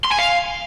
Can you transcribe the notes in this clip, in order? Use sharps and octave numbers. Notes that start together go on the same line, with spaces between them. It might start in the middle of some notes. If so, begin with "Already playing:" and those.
C6
G#5
F5